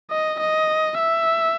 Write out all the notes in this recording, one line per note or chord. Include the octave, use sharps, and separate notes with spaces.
D#5
D#5
E5